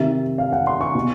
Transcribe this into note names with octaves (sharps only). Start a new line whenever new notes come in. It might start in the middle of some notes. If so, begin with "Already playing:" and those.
Already playing: C3 D#3 E5
F5
F#5
C6
C#6
B2